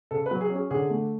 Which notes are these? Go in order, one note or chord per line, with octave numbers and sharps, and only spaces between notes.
C#3 A4
B4
F#3
G#4
C#4
G#4
D3 G#4
A3